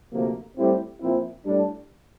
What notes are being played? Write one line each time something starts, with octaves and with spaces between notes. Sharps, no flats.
D2 C3 F3 A#3
A2 G3 C4 E4 G4
A#2 F3 C4 E4
A2 G3 D4